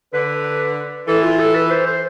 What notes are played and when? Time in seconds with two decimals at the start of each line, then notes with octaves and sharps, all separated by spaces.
0.13 D3 B4
1.07 E3 A4
1.23 F4
1.39 A4
1.55 B4
1.70 C5
1.86 C5